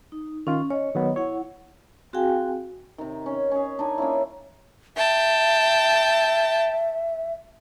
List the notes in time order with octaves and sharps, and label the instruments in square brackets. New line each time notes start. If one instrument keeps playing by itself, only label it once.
[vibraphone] D#4
[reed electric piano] D#3 F4 [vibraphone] C#4
[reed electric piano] C#4 [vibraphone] C#5 D#5
[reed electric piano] D#3 F#3 B3
[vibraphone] E4 F#5 [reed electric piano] C#5
[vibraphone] C4 F#4 G#4 F5 G5 G#5
[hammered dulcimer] C3 D#3
C#4
C#4 G#4
D4 D#4 G#5
A#3 C#4 E4
[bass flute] E5 [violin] G5 A5